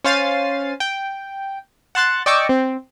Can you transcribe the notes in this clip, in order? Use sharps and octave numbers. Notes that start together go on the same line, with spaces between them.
C#4 C5 F5 A6 C7 D#7
G5
F#5 A5 C6 F#6 A6
D5 D#5 G5 C#6 D6 E6
C4